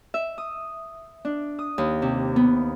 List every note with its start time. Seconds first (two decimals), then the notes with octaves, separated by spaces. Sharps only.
0.14 E5
0.38 D#6
1.25 D4
1.59 D#6
1.78 D#2
2.02 C3
2.36 B3